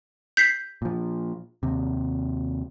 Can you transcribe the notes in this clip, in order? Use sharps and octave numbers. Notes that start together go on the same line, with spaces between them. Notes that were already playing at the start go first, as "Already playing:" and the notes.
G6 B6 C7
A#2 F3
D#2 C3